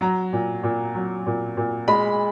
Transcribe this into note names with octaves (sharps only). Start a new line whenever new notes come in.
F#3 A#5
A#2
A#2
F#3
A#2
A#2
G#3 B5